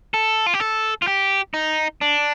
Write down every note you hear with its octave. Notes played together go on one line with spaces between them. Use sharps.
A4
F4
G4
A4
F4
G4
D#4
D4